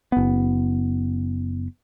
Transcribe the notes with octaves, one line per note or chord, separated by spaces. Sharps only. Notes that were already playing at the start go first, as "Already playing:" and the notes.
F#1 B3